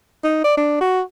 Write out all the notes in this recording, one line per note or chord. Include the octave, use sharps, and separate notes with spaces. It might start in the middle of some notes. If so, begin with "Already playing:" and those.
D#4
D5
D4
F#4